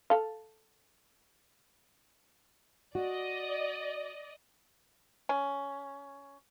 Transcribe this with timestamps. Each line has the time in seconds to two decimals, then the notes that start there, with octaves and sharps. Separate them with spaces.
0.10 A4 F5
2.95 F#4 D5 D#5
5.29 C#4